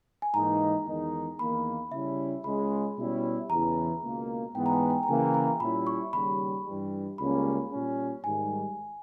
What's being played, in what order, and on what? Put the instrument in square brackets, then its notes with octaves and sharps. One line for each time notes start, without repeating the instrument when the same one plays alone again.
[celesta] G#5
[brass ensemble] G#2 E3 A#3 D#4 [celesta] A#5
[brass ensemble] E2 D#3 G#3 D#4
[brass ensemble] E2 D#3 A#3 [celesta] B5
[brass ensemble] C#3 G3 C#4 E4 [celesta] E5
[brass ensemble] C#2 C#3 G#3 [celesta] B5
[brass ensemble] B2 G3 C#4 E4
[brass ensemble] E2 C#3 E3 [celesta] A#5
[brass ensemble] C#2 B2 A#3
[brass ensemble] G#2 E3 G#3 B3 [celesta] G5
[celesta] A#5
G#5
G5
A#5
[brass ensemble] C#3 E3 A#3 [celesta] G#5
[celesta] A#5
[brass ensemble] A#2 G3 C#4 E4 [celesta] B5
[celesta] C#6
[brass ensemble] D#2 C#3 G3 [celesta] B5
[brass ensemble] G2 E3 G3
[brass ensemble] C#2 C#3 G3 A#3 C#4 [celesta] B5
[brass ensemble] A#2 G3 C#4
[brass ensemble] G#2 D#3 G3 [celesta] G#5